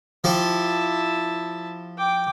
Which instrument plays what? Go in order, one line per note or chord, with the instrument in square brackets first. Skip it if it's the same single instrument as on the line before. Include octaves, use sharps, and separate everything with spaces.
[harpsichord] F3 G4 [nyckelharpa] E4 A5
[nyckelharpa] G5 D6